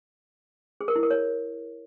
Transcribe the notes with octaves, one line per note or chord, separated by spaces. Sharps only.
G#4
A#4
E4
A#4
C#5